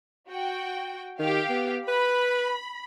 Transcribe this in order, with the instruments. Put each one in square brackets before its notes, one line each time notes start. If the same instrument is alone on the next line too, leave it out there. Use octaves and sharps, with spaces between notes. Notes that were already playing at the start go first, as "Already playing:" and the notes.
[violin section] F#4 G5
[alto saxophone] D#3 [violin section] G4 F5
[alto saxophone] B3
[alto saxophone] B4 [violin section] B5